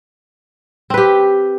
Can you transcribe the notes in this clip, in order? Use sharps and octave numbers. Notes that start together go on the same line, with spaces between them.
C4 G4 B4